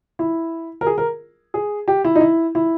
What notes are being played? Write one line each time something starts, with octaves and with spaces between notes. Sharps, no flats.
E4
A#4
G#4
A#4
G#4
G4
E4
D#4
E4
E4